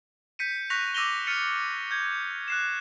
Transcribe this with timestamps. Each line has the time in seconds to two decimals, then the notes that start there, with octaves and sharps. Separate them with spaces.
0.39 G6 B6 C#7 D#7
0.70 C#6 F#6 A#6 B6 F7
0.94 D6 E6 A#6 D#7 F7 G7
1.27 F6 A6 C#7 D#7 F7
1.91 G6 G#6
2.48 F#6 C7 E7